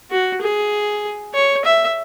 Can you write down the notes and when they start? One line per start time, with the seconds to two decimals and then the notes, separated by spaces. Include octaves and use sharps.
0.11 F#4
0.42 G#4
1.34 C#5
1.65 E5